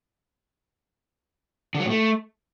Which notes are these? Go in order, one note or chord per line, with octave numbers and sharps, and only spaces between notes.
D3
F#3
A2
A3